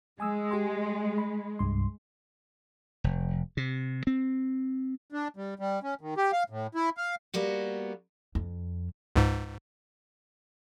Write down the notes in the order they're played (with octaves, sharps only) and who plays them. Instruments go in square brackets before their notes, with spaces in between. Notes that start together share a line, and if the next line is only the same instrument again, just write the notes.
[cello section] G#3 [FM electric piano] G#5 D#6 E6
[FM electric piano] G4 G#5 C6
B5
C2 G2 C6
[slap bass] F1
C3
C4
[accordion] D4
G3
G3
C#4
D#3
G4
F5
A2
E4
F5
[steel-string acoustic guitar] G3 A#3 B3 F#4
[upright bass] F2
[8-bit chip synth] C#2 G#2